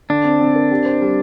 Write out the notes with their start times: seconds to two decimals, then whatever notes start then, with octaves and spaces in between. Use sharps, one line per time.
0.10 D3 D4
0.24 C4
0.41 C4
0.56 A#4
0.71 G4
0.85 C5
1.01 G3